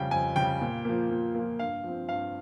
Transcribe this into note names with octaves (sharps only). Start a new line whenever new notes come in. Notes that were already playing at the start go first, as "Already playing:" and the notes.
Already playing: F2 C#3 G3 G5
F2 G#5
C#3 G3 G5
A#2
F3 A#3
A#2
F3 A#3
G2 F5
F3 C4
G2 F5